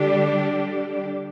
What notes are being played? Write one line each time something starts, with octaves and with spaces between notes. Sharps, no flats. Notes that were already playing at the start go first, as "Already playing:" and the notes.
Already playing: D3 G3 D4 G4